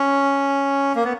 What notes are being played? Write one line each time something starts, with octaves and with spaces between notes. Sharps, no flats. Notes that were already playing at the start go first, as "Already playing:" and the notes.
Already playing: C#4
A#3
B3